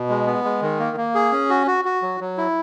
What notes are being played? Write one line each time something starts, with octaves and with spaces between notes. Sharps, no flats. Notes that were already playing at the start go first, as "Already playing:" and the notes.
Already playing: B2
G#3
B3
G#3
D#3
A#3
A#3
G#4
C#4
F#4
F#4
F#4
F#3
F#3
E4